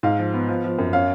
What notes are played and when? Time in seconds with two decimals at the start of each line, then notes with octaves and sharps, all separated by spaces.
0.03 G#2 F5
0.19 F3
0.34 B3
0.49 F3
0.64 F3
0.78 F#2
0.93 C#4 F5